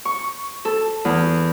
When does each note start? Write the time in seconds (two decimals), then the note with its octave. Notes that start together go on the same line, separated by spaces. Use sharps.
0.05 C#6
0.65 A4
1.05 E2